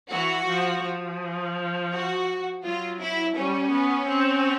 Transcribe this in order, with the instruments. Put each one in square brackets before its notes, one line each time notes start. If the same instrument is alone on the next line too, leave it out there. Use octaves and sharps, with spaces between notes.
[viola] E3 [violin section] F#4
[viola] F3
F3
[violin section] F#4
[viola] F#3 [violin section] F4
[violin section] E4
[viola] G3 [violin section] C#4
[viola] B3
C4